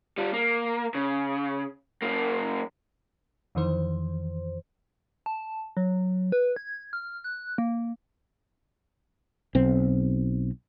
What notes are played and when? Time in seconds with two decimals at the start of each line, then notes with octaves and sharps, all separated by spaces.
0.18 G3 F4
0.34 A#3
0.95 C#3
2.02 F#2 A#3
3.55 F2 D#3 E3 C5
5.26 A5
5.77 F#3
6.32 B4
6.56 G#6
6.93 F6
7.24 F#6
7.58 A#3
9.55 B1 C4